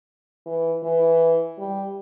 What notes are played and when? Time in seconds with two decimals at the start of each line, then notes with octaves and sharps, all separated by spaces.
0.46 E3
0.83 E3
1.58 G3